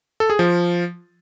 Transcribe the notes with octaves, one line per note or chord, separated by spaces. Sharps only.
A4
G#4
F3